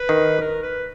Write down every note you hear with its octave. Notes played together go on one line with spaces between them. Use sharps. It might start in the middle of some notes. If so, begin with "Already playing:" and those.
Already playing: B4
D#3
A#4
B4